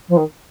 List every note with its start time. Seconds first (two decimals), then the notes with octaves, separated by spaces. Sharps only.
0.08 F3
0.16 D#3